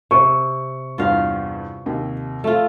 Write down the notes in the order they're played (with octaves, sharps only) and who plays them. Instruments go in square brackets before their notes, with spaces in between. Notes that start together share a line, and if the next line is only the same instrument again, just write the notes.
[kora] C3 [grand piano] C#6
[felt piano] E2 G2 [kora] F4 F5
[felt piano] D#2 C3
[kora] A3 F4